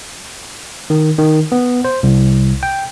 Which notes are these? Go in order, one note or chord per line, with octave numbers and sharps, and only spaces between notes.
D#3
D#3
B3
C5
C2
G5